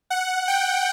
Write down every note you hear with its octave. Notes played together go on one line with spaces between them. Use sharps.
F#5
G5